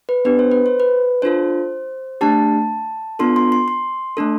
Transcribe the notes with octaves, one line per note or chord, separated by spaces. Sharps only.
B4
B3 D4 G4 B4
C5
B4
C5
B4
D4 F4 A4 C5
A3 D4 G4 A5
B3 D4 F4 A4 C6
C6
C6
C6
A3 D4 A4